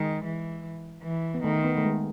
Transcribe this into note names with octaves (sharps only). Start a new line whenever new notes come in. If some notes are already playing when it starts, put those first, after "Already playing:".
Already playing: D#3 G#3
E3
E3
B3
D#3 A3
B3
A3
G#3